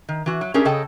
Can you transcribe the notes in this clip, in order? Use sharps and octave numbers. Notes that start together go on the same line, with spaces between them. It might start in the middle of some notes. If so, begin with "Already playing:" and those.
D#3
E3 F#4
F#3
A3 C#4 D4 G4 G#4 A#4
C#3 G#4 A4 D#5 G5 A5